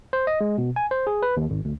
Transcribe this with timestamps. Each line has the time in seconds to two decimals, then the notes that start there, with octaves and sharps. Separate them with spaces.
0.13 C5
0.27 D#5
0.41 G#3
0.58 B2
0.76 G#5
0.91 C5
1.07 G#4
1.23 B4
1.37 D#2
1.50 G#1
1.65 D2